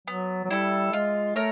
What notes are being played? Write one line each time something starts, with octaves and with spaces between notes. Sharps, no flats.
F#3 B3
F#3
G3 E4 A4
G#3 F4
A3 A#4 C#5